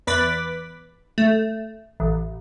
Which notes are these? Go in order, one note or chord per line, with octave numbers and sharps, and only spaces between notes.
E2 B4 B5 D6 A6 B6
A3
A1